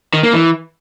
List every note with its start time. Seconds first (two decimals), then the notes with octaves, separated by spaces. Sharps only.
0.14 D#3
0.23 A#3
0.33 E3